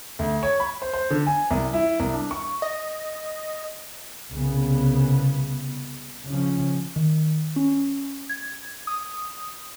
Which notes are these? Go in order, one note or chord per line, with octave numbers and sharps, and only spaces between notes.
D2
C#5
B5
C5
C5
D3
G#5
C2
E4
C2
D4
C#6
D#5
C2 C#3 B3
C#3 F3 C#4
D#3
C#4
G#6
D#6